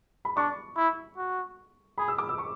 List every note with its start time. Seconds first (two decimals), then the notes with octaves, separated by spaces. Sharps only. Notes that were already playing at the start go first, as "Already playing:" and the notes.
0.25 B5
0.37 D4 C#6
0.77 E4
1.17 F#4
1.98 G#4 B5
2.08 E6
2.18 D6
2.29 E6
2.38 C#6